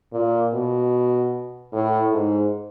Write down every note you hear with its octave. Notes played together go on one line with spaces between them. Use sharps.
A#2
B2
A2
G#2